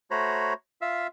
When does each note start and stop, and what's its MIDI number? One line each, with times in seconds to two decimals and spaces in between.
0.11 0.53 57
0.11 0.53 66
0.11 0.53 72
0.11 0.53 73
0.11 0.53 82
0.11 0.53 83
0.82 1.07 65
0.82 1.07 76
0.82 1.07 77
0.82 1.07 88